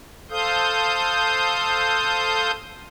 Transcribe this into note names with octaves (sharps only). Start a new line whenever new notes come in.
A4 C5 F5 D#6 G6